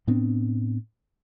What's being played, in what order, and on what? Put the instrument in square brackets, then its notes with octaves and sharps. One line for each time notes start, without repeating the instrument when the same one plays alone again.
[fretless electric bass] A2 B3 C4 D4